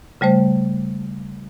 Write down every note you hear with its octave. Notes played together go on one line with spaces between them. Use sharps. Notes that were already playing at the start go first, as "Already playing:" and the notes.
C#3 G3 A3 C5